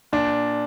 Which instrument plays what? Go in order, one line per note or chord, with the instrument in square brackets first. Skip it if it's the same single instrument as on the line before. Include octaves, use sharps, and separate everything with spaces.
[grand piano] A#2 D4